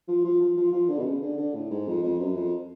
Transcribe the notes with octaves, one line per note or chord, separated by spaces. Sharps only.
F3
F3
F3
F3
F3
D3
B2
C#3
D3
D3
A2
G#2
F2
F2
F#2
F2